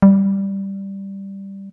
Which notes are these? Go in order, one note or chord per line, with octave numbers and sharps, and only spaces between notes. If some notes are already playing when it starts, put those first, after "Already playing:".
G3